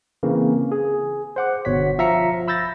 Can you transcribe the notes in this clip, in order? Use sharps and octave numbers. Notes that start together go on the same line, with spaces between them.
C#3 E3 A#3 C4
G#4
C5 F#5 D6
G1 B2 C#5 F#5 B6
F3 E5 F5 A#5 B6 C#7
B5 E6 G6 A6 A#6